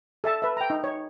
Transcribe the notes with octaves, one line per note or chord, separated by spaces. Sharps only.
A4 E5 A5
B4 E5
G5 A#5
D#4
C#5